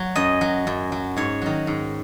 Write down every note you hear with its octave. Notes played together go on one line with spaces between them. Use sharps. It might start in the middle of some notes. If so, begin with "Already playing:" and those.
Already playing: F#3
F#2 D#5
F#3
F#2
F#3
G#2 C#5
D#3 F#3
G#2